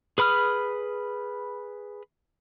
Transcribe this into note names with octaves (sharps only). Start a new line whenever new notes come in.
G#4 B4 B5 D#6 F6